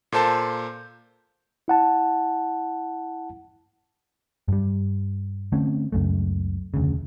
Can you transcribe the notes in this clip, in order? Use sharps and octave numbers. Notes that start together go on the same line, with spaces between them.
A#2 A#3 A4 C5 A5 G6
E4 F#5 A5
G2 G3
D3 A3 C4 C#4
C#2 F#2 A3
F1 D2 C#3